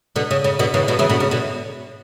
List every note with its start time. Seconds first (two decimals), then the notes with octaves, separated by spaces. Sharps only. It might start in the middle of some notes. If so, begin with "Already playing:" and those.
0.16 B2 D3
0.31 C#3
0.44 C#3
0.59 B2 D3
0.74 C#3 E3
0.88 B2 D3
0.99 C#3 E3
1.09 B2 D3
1.20 C#3
1.31 B2 D3